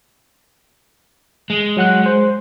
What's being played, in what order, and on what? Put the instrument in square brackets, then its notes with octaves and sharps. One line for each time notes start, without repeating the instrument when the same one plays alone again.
[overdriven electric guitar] G#3
[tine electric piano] F#3 F#5 F#6
C5